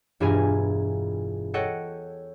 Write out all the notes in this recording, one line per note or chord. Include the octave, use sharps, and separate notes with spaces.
E1 G2 E4 F4 G#5 A#5
A4 C#5 D#5 F#5 G5